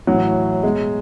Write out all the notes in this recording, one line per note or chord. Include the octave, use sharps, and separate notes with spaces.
A2 E3 F#3
B2 G#3